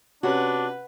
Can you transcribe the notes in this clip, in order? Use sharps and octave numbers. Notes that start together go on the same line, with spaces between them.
C3 C#4 D4 F#4 B4